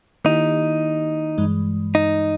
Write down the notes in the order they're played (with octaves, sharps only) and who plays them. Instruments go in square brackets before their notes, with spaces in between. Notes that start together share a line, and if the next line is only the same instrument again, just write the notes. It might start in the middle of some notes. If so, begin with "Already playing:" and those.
[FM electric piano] D#3 A#3 E4 G4 [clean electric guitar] D#4
[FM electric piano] G2 E3 G#3
[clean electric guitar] D#4